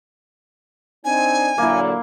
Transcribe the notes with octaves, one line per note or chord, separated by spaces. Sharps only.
C4 D4 D#4 G#5
A#2 D3 F#3 A#3 E4